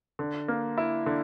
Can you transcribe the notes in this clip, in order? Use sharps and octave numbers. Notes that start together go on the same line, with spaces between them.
D3
A#3
E4
D3